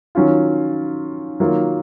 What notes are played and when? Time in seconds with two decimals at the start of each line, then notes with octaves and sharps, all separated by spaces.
0.15 D#3 F#3 C#4 F4
1.40 D#3 F#3 A#3 F4